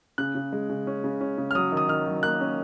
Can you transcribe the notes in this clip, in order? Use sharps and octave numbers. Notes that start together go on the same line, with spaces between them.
C#3 F#6
C#3
G#3
C#3
C#4
C#3
C#4
C#3
F6
F#3 D#6
D#3
D#6
D#3 F6
F#3
A#3 F#6
C#4